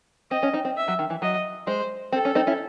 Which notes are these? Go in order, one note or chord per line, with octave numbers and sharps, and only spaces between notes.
C4 D#5
C#4
C4 D#4
C4
E5
F#3
D#3
E3
F#3 D#5
G#3 C5
C4 A4
C#4
C4 D#4
C#4 E4